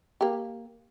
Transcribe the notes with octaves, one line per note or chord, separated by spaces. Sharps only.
A#3 G4